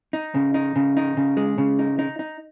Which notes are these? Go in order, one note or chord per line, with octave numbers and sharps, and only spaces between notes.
D#4
C#3
D#4
C#3
D#4
C#3
G#3
C#3
D#4
D#4
D#4